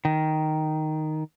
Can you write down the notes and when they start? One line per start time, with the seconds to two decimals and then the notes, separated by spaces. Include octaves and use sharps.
0.05 D#3